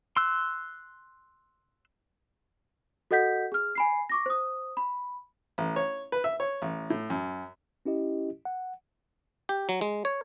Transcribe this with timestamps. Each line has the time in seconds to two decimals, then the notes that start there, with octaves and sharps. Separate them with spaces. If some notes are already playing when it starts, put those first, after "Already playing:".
0.17 C6 E6 F#6
3.11 F#4 A4 D#5 F#5 G6 B6
3.52 G#4 F6
3.75 G#5 B5 C7
4.10 C#6 D6 A#6
4.26 C5 D#6
4.77 B5
5.58 A1
5.76 C#5
6.12 B4
6.24 E5
6.40 C#5
6.62 A1
6.90 A2
7.10 F#2
7.86 C#4 E4 G4 D#5
8.45 F#5
9.49 G4
9.69 F#3
9.81 G#3
10.05 C#5